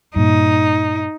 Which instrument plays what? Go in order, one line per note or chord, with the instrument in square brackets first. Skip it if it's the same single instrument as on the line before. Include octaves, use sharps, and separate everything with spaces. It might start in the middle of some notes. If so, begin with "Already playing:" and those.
[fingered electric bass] G2 A#2 [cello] D#4